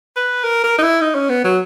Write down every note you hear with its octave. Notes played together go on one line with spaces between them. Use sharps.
B4
A#4
A#4
D#4
E4
D#4
C#4
B3
F#3